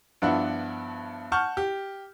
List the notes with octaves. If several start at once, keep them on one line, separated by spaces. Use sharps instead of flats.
G2 F3 B3 D4 E4 F#5
F#5 A5 C#6 F6 G6
G4